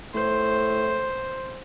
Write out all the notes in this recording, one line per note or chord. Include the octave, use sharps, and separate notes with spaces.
A2 C5